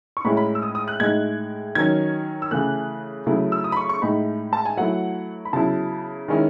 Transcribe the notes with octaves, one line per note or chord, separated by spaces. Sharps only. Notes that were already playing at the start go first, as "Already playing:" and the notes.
C#6
A2 G#3 C#4 E4 B5
B5
E6
D#6
D#6
F#6
A2 G#3 D#4 G#6
D#3 F#3 C#4 G#6
E6
C#3 E3 A3 F#6
C#3 F#3 A3 E4
E6
D#6
B5
C#6
C#6
A2 G#3 D#4 B5
A5
G#5
F#3 A3 E4 F#5
B5
C#3 F#3 B3 E4 A5
D#3 G#3 C#4 E4